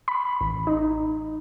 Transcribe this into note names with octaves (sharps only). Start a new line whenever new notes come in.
B5
A1
D#4